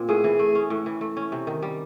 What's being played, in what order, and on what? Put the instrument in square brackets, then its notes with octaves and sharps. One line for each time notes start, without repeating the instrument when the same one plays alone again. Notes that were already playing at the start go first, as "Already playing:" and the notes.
Already playing: [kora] A#2 C4
[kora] A2 [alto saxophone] G#4
[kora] E3
A3
C#4
A2
E3
A3
C#4
C3
D#3
G3